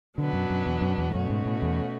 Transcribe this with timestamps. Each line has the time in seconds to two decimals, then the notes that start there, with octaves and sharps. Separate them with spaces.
0.18 B2 D3 F#3 B3 D4
0.33 F#2
0.50 F#2
0.66 E2
0.81 F#2
0.98 E2
1.10 G#2
1.14 F#2 B2 A3 C#4 F#4
1.30 G#2
1.46 A2
1.62 E2